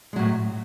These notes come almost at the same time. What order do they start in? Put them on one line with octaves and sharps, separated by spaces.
G#3 F#3 A2